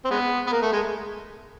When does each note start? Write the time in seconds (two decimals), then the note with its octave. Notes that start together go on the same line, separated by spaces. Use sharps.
0.05 C4
0.11 G#3 B3
0.47 B3
0.52 A#3
0.62 A3
0.72 G#3